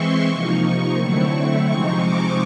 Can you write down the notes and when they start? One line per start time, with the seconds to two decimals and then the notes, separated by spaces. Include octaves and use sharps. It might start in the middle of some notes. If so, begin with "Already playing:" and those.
Already playing: E3 G#3 C4 E4 C6 C#6
0.26 C3 F3 A#3 D#4 C#6
0.96 D3 F#3 A3 C4 E4 C#6
1.65 C3 F3 G#3 C4 D#4 C#6
2.00 D6